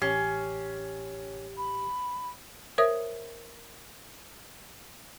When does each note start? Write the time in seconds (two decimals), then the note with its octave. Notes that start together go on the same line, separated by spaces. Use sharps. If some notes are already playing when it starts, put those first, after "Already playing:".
0.02 A1 C#4 G4 C7
1.57 B5
2.78 A#4 C5 C#5 E5 D#6